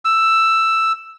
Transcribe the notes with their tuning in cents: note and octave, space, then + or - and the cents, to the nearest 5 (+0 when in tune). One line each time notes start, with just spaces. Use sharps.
E6 +5